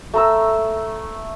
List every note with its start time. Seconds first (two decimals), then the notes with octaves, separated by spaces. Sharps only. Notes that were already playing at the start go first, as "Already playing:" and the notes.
0.14 A3 A#5 E6